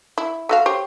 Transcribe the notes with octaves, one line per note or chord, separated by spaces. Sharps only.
E4
A3 F#4 F5
G4 C5 C#5